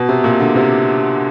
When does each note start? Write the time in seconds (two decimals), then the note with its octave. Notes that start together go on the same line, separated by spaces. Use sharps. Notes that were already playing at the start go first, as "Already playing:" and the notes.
Already playing: B2
0.09 C3
0.24 A#2
0.40 D3
0.55 C3